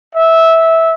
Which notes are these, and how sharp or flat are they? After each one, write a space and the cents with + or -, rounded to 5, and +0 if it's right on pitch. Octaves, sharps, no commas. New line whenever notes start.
E5 -15